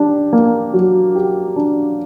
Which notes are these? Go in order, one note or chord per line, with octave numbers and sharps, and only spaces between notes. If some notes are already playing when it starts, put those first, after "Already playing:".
Already playing: D4 G4
A#3
F#3
G4
D4